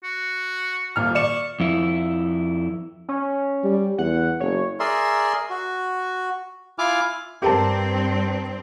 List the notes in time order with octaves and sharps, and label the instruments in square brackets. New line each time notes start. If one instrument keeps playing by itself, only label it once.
[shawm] F#4
[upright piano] D#1 A#2 F6
[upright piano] D5 E7 [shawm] C#6
[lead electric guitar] F2 E4
[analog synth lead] C#4
[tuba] G3
[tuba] E2 [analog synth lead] F#5
[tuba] F#1 [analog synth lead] C#5
[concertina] G#4 A#4 D5 E5 C6
F#4
E4 F4 G#5 D6 F6
[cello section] G2 C4 [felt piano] G4 A#4 A5